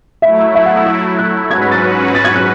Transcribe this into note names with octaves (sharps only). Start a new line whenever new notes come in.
F#3 A3 E4 E5
E5
F#5
E6
E6
F#6
G#2 F#3 C#4 F#4 B4 G#6
B6
A6
A6
G#6
F#6